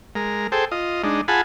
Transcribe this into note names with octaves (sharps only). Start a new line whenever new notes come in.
G#3 A#4
G#4 A4 C5 G5
F4 D#5
G#3 D4 D#4
F4 G#4 F#5 G#5 A5 B5